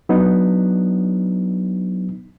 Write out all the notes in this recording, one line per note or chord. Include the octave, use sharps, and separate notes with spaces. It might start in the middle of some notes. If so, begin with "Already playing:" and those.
F#3 B3 D4 D#4